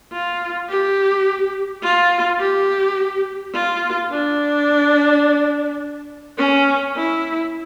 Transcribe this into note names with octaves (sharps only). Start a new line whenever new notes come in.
F4
G4
F4
G4
F4
D4
C#4
E4